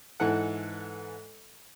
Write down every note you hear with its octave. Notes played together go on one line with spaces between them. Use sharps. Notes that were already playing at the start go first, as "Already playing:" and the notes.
G#2 E3 A4 F#5